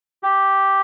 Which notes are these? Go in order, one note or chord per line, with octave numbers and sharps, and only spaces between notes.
G4